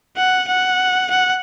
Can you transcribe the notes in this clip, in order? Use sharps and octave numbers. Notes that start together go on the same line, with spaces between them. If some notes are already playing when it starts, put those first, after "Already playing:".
F#5
F#5
F#5